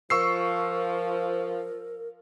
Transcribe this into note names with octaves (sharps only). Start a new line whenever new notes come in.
F3 A#4 C#6 E6 C7